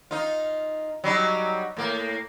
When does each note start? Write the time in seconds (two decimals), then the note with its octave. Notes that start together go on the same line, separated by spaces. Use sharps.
0.11 D#4 F4
1.04 F#3 G3 D#4
1.77 A2 A#3